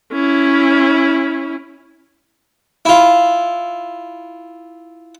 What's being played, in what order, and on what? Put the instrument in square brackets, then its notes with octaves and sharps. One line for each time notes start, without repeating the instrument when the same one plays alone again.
[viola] C#4 E4
[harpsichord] E4 F4